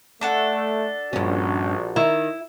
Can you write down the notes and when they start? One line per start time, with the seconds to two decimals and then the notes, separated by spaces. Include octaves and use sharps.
0.21 A3 D4 A4 F#5
1.13 A#1 G2 C#4 F#4
1.96 D#3 E4